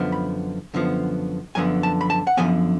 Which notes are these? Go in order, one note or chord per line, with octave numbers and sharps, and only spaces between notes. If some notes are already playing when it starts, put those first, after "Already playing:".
Already playing: F#2 D3 F3 B3
B5
F#2 D3 F3 B3
F#2 D3 F3 B3 G#5
A5
B5
A5
F#5
F#2 D3 F3 B3 G#5